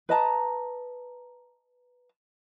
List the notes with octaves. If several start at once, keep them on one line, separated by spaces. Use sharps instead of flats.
B4 D#5 A5 A#5